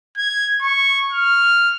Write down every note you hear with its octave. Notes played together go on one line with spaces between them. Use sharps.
G#6
C#6
F6